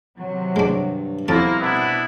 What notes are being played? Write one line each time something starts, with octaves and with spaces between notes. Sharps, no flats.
C3 D#3 F#3
G2 G#3 D4
C2 F2 A#3 B3 E4 A#4 C5 A5
B2 B3 D4 E4